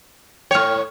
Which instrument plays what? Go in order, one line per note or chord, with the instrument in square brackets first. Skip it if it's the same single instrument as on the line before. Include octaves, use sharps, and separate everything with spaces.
[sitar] A2 C#5 [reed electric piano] G5 F6